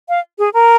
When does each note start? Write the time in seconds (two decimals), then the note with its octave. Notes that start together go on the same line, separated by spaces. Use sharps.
0.09 F5
0.39 G#4
0.54 A#4